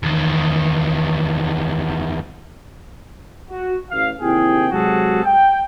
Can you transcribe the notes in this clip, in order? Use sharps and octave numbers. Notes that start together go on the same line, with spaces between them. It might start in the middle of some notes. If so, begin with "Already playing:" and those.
E2 D#3
F#4
A1 F5
D#2 C3 E4 G#4 G5
C3 F#3 G#3 F#4 G#4 A4
G5